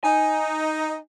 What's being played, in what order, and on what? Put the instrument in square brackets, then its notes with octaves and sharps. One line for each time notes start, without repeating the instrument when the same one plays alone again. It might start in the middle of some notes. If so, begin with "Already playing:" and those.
[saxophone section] D#4 [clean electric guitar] G#5